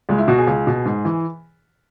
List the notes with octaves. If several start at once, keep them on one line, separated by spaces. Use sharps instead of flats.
C#2 G#3
E4
B2 F#4
G#4
C#2
B2
G#2
E3